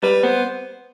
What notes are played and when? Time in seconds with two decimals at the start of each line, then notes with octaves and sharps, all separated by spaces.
0.03 G3 B4
0.23 B3 C5